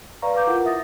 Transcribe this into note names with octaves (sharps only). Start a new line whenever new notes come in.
B4 D5 F5 A#5 C#6
B4 F5 D6 G6
E4 F4 A#4 F#5
E5 D#6 A6 A#6